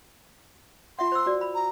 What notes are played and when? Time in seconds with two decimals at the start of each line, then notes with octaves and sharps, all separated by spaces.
0.99 F4 E5 F#5 C6
1.12 C5 E6
1.26 F#4 D5
1.41 B5
1.55 A#5